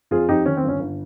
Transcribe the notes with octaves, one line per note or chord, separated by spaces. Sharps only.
F2 F4 G#4
F2 D#4 G4
D#3 C#4
C4
G1
C#4
G1